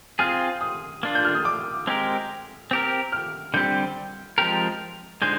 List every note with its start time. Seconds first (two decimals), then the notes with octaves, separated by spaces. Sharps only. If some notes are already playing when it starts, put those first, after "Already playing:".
0.19 C4 F4 G#4 F6
0.61 D#6
1.03 A#3 D4 F4
1.15 G6
1.25 F6
1.35 D#6
1.45 D6
1.87 G#3 C4 G4 A#4
2.71 C4 G4 A#4
3.12 F6
3.54 D3 G3 C4 G4 G6
4.38 F3 G#3 C4 G4 A#4
5.22 D3 G#3 D#4 C5 G6